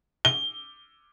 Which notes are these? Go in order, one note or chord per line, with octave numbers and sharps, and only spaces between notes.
G7